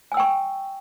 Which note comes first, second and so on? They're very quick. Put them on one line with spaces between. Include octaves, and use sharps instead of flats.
G#5 E6 G5 C#6